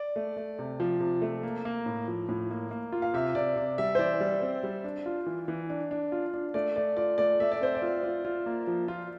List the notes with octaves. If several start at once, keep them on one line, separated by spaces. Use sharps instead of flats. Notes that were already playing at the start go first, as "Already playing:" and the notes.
Already playing: D5
A3
A3
C3
F3
C3
A3
A#3
A#3
A2
F3
A2
A#3
A#3
F4
F5
C3 E5
C3 D5
C3
G3 E5
C5
E3 D5
G3
C4
G3
D4
F4
E3
E3
D4
D4
F4
D4
A3 D5
A3 D5
F4 D5
A3 D5
A3 E5
D5
C4 C5
D5
F4
F4
F4
A#3
F3
F4